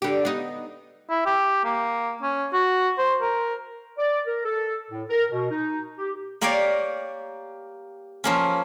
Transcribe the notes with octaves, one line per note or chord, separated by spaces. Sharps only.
D3 G4
B3 D#4
E4
G4
A#3
C#4
F#4
C5
A#4
D5
A#4
A4
A2
A#4
B2
D#4
G4
A#3 G4 A#4 C#5 D5 F5
F3 A#3 C#4